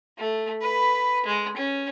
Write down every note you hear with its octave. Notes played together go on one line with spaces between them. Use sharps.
A3
B4 B5
G#3
C#4